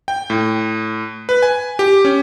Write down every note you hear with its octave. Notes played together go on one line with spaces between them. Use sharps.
G5
A2
B4
G#5
G4
C#4